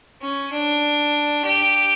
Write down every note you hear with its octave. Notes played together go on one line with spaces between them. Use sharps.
C#4
D4
G4